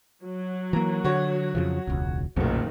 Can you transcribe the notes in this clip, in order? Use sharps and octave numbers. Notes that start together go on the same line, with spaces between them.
F#3
E3 A#3 A#5
D3 F#4 C#5
F2 C#3 F3
E1 C#2
F#1 B1 A#2 D#3 F#3 A3